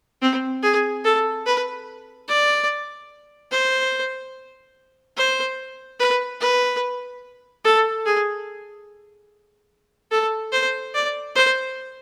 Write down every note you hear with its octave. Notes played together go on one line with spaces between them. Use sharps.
C4
G#4
A4
B4
D5
C5
C5
B4
B4
A4
G#4
A4
C5
D5
C5